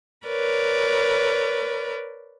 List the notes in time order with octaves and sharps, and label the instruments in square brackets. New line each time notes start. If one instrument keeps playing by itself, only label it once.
[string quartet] A#4 B4 C#5 D5